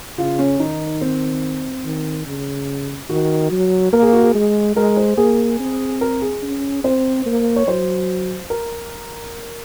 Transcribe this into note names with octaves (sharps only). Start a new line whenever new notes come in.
C#3 F4
C#4
D#3 D#4
C4
D#3
C#3
D#3 F#4
F#3
A#3 A#4
G#4
F#4
G#4
G#3
G#3 A#4
C5
A#3 G#4
C4
A#4
G#4
C#4
C4 C5
A#3
C#5
F#3 C5
A#4